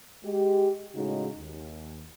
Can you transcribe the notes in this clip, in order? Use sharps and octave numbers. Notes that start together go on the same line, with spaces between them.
G#3 G4
A2 C#3 G#3 D#4 F#4
D#2